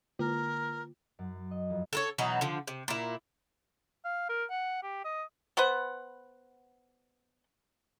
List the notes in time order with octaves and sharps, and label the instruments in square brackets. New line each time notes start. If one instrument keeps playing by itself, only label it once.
[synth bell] D3 A#3 F4 [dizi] A#4
[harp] F#2
D#5
F2
[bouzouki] A4 A#4 C#5
B2 E3 F#3 D#4
D3 F3
C3
A#2 E4
[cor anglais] F5
A#4
F#5
G4
D#5
[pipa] B3 B4 C5 F#5